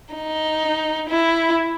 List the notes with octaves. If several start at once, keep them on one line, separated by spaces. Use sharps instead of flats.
D#4
E4